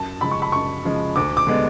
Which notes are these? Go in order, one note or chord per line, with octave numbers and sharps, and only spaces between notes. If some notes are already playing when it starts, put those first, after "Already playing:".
Already playing: F#2 A5
C#3 F3 G#3 B5
C#6
B5
F#2 C#6
C#3 F3 G#3
D2 D6
D6
D3 G#3 B3 D4